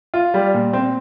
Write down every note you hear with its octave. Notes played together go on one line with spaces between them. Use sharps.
F4
G3
A#2
C4